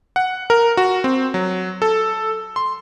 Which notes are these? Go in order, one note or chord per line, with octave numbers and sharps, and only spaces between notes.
F#5
A#4
F#4
C4
F#3
A4
C6